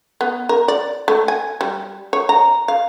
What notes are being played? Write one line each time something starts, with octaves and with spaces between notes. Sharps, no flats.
B3
A#4
D5
A3
G#5
G3
C#5
A#5
F5